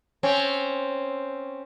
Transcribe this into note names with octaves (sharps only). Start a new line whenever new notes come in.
C4 C#4